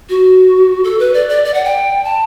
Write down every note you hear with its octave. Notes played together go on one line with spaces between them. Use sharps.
F#4
A4
B4
D5
D5
D5
F#5
G5
A5